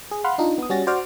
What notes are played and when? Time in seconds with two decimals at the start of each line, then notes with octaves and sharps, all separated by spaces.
0.11 G#4
0.24 F5 F#5 B5 C6 F6
0.38 D4 D#4 F4
0.58 B3 D#6
0.70 G3 C#4 F#4 A6 A#6
0.87 F#4 C5 D5 D6 F6